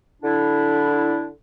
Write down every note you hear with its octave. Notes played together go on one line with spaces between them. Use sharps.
D3 D4 E4